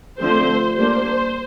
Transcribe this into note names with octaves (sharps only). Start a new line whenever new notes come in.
D3 F3 A3 C4 C5
G3 A#3 D4 C5